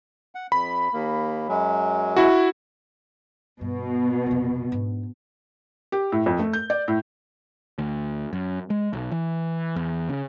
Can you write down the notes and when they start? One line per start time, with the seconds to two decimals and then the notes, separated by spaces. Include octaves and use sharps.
0.35 F#5
0.52 F2 B5
0.93 D#2 A#3
1.48 F#2 F#3 G#3
2.17 E4 F#4
3.61 G2 B2
4.26 F1 F2
4.72 G#2 D4
5.92 G4
6.12 A2
6.26 F2
6.39 A3
6.53 G6
6.70 D5
6.88 A2
7.78 D2
8.33 F#2
8.70 G#3
8.93 B1
9.12 E3
9.76 E2
10.09 C#3